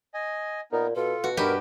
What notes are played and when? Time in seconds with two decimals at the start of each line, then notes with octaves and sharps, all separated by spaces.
0.14 D#5 G#5
0.72 A#2 B3 D#4 A#4
0.96 B2 F4 A4
1.24 B2 F#4
1.37 G2 D#4 G4 A#4 B4 C#5